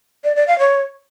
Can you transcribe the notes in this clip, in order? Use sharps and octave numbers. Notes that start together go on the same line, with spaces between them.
D5
D5
F5
C#5